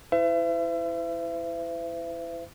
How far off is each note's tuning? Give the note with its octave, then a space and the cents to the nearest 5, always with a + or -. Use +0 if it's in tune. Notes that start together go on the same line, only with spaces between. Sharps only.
E4 +0 C5 -45 E5 +35